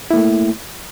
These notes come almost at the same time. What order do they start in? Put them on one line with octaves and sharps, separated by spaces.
E4 A#3 A3